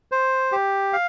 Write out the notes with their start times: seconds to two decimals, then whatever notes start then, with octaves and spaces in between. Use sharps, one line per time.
0.12 C5
0.52 G4
0.93 F5